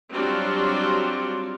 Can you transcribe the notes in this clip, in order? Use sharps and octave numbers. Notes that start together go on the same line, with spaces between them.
F#3 G3 C4 D4 F4 F#4